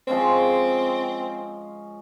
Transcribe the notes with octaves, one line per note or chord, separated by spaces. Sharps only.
F3 G#3 C4 C#4